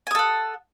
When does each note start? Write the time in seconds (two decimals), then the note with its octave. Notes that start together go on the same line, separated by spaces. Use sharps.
0.07 G#5
0.11 D#6
0.15 A4
0.19 F#5